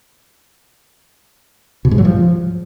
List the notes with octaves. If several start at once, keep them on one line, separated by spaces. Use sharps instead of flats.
B2
G#2
F#3
F3